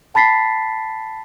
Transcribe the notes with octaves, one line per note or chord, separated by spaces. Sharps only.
G5 A5 B5 A6 B6 C7